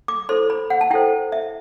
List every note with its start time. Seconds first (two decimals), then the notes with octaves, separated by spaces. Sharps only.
0.08 D6
0.29 E4 A4 C5 C6
0.50 B5
0.70 F#5
0.81 A5
0.91 E4 A4 C5 G5
1.32 E5